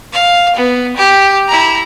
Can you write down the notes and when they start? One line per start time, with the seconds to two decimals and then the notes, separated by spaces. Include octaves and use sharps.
0.13 F5
0.56 B3
0.96 G4
1.48 E4 A#5